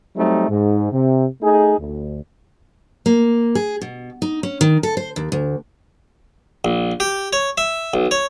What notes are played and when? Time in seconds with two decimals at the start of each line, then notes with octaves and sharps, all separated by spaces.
0.16 F#3 G3 A3 C4 D#4
0.49 G#2
0.92 C3
1.42 A3 D#4 G#4
1.78 D2
3.06 A#3
3.55 G#4
3.81 B2
4.22 D#4
4.43 C#4
4.61 D#3
4.83 A4
4.97 C5
5.16 D#2
5.32 D2
6.65 A#1
7.00 G4
7.33 C#5
7.58 E5
7.94 B1
8.11 C#5